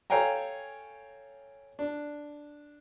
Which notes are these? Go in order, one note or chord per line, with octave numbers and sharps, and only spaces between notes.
A4 C#5 F5 G5 G#5 A#5
D4